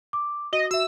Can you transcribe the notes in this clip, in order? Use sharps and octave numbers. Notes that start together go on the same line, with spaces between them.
D6
F#4 D#5
F#4 E5 E6